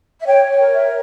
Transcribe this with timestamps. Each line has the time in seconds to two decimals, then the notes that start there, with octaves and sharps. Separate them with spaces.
0.20 E5
0.26 C#5 G5
0.58 A#4
0.73 E5